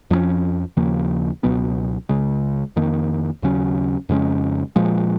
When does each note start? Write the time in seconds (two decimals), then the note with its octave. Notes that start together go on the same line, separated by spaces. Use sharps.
0.10 F2 F3 G#3 C#4
0.77 D#2 C#3 F3 A#3
1.43 C#2 B2 F#3 B3
2.09 C#2 C#3 G#3
2.76 F2 D#3 A#3
3.42 D#2 C#3 F#3 C#4
4.09 F2 C#3 G#3 C#4
4.76 A#2 F3 G#3